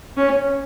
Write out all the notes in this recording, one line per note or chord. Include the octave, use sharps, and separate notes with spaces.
C#4